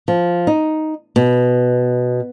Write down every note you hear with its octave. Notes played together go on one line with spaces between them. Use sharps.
F3
D#4
B2